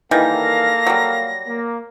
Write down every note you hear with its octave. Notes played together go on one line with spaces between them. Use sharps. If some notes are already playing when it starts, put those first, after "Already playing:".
D#3 E3 G3 A#3 A4 F5 A#6
F#3 G3
A#3